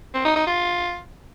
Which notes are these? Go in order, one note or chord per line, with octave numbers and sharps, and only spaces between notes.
C4
D#4
D#4
F4